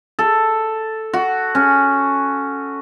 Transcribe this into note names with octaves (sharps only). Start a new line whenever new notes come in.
A4
F#4
C#4